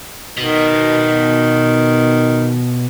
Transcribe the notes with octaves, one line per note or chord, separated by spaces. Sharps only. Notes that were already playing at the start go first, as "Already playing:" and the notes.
B2 D#3